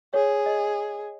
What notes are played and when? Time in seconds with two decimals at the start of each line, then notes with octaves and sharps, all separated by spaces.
0.14 G#4 C#5
0.46 D#5